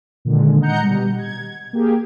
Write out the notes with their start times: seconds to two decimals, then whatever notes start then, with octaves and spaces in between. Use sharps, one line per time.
0.25 A#2 D3 D#3 G#3
0.61 D#5 F#5 A#5 G6 C#7
0.83 B2 G3
1.19 G#6
1.73 A#3 G4 G#4